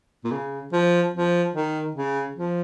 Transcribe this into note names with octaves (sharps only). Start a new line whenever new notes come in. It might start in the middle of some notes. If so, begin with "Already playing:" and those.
A#2
C#3
F3
F3
D#3
C#3
F3